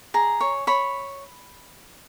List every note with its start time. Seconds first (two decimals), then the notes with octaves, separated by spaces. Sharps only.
0.14 G#4 A#5
0.41 C#5
0.67 C#5 B5